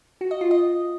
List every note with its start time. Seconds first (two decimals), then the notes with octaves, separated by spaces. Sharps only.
0.21 F#4
0.31 D#5
0.41 F4
0.51 D#5